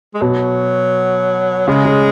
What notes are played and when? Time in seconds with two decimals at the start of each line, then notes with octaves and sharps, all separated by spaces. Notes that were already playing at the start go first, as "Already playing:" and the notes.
0.14 G#3
0.21 B2 F#3
1.68 C#3 G#3
1.85 C#3